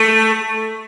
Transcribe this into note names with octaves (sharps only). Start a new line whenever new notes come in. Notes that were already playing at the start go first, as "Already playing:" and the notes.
Already playing: A3